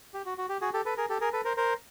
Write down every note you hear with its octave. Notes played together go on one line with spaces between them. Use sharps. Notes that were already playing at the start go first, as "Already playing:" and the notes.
G4
F#4
F#4
G4
F#4 G#4
G4 A4
A4 B4
G#4 A#4
G4 A4
G#4 A#4
A4 B4
A#4 C5
A#4 C5